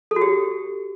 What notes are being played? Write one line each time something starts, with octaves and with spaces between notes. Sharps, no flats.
A4
F#4
G4